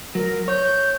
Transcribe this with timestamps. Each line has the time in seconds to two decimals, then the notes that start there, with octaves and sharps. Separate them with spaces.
0.15 F#3 A#4
0.48 C#5 G6